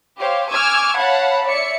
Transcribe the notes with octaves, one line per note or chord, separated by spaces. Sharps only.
G4 C5 C#5 F5
G#5 C#6 D6 E6 F6 G#6
C#5 F5 F#5 A5 B5
C#5 D5 E5 C#7